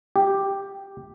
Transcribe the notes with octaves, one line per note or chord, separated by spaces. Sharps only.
G4